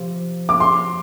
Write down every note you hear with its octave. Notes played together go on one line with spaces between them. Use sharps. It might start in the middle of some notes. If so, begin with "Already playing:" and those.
Already playing: C3 F3 G4
D6
C6